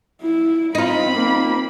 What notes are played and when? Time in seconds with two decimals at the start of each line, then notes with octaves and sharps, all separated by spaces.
0.22 E4
0.75 C4 D#4 F4 B5
1.13 A#3